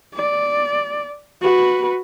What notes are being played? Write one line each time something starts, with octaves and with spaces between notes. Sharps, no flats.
D5
F#4 B4